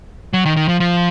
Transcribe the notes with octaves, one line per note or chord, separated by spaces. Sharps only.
F#3
D#3
D#3
F3
F3